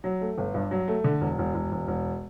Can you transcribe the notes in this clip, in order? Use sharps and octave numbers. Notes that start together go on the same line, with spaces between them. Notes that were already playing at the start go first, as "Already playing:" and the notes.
F#3
A3
G1
G2
F#3
A3
D3
E1
E1
E1
E1
E1